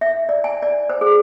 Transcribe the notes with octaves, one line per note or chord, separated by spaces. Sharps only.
E5
D5
G#5
D5
C5
G#4